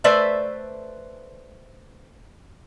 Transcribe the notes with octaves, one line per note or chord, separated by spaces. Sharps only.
A3 B4 C5 D5 E5